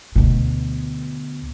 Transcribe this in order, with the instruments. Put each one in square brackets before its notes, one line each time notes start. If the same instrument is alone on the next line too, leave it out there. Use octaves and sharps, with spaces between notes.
[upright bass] D2 B2